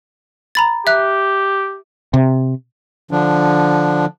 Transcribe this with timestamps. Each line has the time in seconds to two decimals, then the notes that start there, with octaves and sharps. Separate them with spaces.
0.55 A#5 B5 A6
0.87 G4 E5 F#6
2.14 C3
3.11 D3 F3 D4